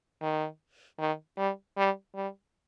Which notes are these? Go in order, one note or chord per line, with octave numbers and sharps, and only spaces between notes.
D#3
D#3
G3
G3
G3